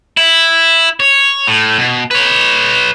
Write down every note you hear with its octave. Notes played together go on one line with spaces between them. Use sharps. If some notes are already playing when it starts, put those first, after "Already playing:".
E4
C#5
A2
B2
B4 C#5